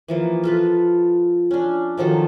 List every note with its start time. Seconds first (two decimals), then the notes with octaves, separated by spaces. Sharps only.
0.08 E3 F3 A#3
0.44 F4 A4 B4
1.51 C#4 D4
1.97 D#3 F3 F#3 A4